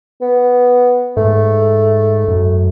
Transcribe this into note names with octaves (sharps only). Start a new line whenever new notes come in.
B3
G#2 A3
F#2